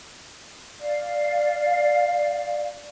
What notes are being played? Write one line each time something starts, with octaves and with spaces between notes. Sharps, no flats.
D5 F5